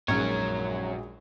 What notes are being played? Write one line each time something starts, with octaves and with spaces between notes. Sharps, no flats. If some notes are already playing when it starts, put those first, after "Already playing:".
A#1 F#3 G#3 C#4 D#4 A#4 C#5